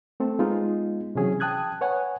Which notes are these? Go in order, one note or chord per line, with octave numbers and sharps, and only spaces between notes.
A3 C4 A4
G#3 B3 D#4 F4
C3 E3 F#3 C#4 G#4
G5 A5 D#6 F#6 G#6
B4 C#5 F#5 G#5